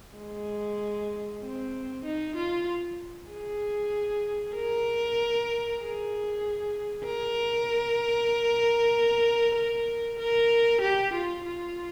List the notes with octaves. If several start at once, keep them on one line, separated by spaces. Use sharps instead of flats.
G#3
C4
D#4
F4
G#4
A#4
G#4
A#4
A#4
A#4
G4
F4
F4